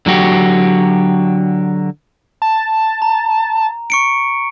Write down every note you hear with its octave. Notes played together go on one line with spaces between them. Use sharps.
D3 F#3 F#4 G4
A5
A#5
C#6 C#7 D7